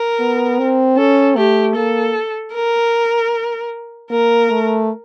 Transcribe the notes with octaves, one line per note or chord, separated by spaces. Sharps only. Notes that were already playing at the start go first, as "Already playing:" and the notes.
Already playing: A#4
B3
C4
C#4 A4
A3 G4
A#3 A4
A#4
A#3 A#4
A3